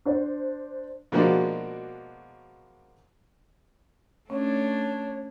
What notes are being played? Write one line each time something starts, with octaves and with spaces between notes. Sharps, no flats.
D4 C5
B2 F3 G#3 A#3 D4 F#4
A3 C#4 D4 C#5